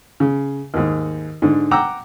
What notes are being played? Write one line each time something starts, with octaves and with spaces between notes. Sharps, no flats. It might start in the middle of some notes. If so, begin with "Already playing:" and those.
C#3
D#2 G#2
G#2 D3
F#5 G5 A#5 D6 E6